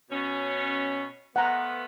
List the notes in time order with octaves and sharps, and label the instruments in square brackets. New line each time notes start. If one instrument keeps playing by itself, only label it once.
[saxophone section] B2 C#4
[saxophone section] F3 A3 B3 [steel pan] F#5 A#5